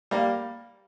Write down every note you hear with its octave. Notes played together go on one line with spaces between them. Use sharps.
G3 A#3